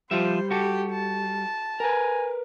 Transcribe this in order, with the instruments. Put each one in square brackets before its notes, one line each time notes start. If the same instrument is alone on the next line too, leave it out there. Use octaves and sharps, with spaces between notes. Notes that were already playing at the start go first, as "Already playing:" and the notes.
[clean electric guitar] F3 F4 E5 [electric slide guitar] G3 [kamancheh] C5
[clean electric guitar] F#4 A4 [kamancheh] G4
[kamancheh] A5
[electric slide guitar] A#4 B4 [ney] G#5